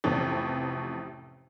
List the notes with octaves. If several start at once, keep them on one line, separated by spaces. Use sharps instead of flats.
A1 F2 A2 C3